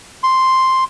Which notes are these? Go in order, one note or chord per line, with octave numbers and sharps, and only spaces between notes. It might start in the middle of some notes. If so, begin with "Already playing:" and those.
C6